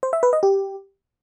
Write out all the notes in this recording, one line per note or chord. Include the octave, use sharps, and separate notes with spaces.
C5
E5
B4
D#5
G4